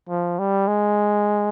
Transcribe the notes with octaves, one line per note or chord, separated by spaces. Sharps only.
F3
G3
G#3